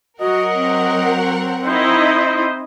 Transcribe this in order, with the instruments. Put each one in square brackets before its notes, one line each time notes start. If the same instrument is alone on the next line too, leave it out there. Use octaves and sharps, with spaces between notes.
[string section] F#3 A#4 F#5 [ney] F#4 [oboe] D#5
[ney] C4
[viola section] D#4 E4 D#5 [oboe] C5